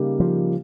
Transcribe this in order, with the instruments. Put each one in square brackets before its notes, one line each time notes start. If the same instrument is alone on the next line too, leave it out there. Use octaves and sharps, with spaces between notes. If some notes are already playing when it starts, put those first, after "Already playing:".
Already playing: [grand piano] C#3 G3 A#3 D#4 G4
[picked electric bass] F3